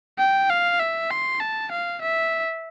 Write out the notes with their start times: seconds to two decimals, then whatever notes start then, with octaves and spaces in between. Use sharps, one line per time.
0.19 G5
0.49 F5
0.80 E5
1.10 C6
1.40 A5
1.72 F5
2.02 E5